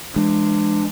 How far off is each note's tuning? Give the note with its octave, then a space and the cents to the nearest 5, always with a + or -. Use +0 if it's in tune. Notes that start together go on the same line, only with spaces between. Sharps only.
E3 +35 G#3 +0 D4 +25